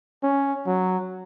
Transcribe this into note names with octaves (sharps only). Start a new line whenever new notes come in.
C#4
F#3